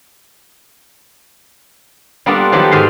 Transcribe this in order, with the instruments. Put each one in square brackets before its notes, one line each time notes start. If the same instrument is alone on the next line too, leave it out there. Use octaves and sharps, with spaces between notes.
[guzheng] G3 A#3 B3 D4 F4 A4
D#3 F3 F#3 G4 A4
G#2 D#3 G#4 F5 C6